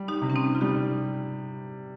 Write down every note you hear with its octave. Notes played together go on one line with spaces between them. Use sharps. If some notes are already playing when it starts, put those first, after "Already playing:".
Already playing: G3
D#4 G4
C3
C#4
C4 D#4
F4
G3 D#4 G4